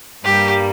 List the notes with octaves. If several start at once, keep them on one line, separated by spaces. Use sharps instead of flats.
G2 G3 A#3 G4